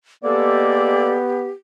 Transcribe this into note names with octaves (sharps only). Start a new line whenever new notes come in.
G#3 A#3 B3 G4 A4 D5